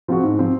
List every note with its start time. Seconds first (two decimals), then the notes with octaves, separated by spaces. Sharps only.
0.08 F3 C4 F#4
0.24 G#2
0.39 F3 C4